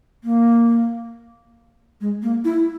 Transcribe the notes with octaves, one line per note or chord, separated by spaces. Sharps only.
A#3
G#3
A#3
E4